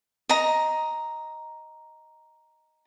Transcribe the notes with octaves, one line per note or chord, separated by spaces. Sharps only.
D#5 A#5